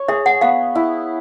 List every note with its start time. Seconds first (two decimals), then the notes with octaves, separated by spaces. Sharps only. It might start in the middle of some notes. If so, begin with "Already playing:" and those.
Already playing: C#5
0.08 G#4 E5
0.26 F#5
0.41 B3 F5
0.75 E4